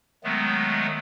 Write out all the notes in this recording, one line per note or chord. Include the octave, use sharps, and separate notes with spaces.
D#3 F#3 G#3 A3 B3